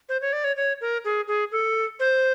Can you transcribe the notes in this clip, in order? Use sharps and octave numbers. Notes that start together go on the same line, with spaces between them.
C5
C#5
D5
C#5
C#5
A#4
G#4
G#4
A4
C5